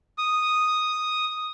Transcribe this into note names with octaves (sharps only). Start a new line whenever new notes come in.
D#6